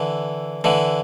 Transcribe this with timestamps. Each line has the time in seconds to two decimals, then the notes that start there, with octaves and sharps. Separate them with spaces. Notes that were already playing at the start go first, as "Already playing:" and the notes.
Already playing: D3 E3
0.64 D3 E3